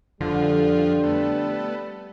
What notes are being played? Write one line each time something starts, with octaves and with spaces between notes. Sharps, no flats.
F2 D3 F3 G3
A3 B3